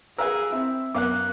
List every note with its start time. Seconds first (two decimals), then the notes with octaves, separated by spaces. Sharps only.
0.18 G#4 A#4 B4 F5 E6
0.52 C4 E4 E5
0.95 F#2 A#3 B3 F5 D6 F#6